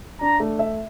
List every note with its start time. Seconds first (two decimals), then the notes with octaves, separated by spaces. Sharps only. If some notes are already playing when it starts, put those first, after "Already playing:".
0.21 D4 A#5
0.40 A3
0.59 E5